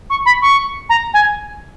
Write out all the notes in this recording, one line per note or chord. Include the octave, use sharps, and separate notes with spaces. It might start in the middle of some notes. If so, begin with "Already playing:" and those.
C#6
B5
C#6
A#5
G#5